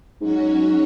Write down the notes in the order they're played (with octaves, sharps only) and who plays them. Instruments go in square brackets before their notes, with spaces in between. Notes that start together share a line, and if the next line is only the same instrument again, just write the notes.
[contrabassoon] G#2 [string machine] F#3 C#4 F#4 C#5